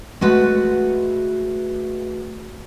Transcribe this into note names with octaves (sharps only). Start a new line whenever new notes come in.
G#3 A3 F#4 B4 F#5